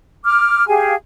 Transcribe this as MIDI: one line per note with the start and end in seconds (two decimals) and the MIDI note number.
0.24 0.67 86
0.24 0.67 89
0.67 0.94 67
0.67 0.94 68
0.67 0.94 77
0.67 0.94 80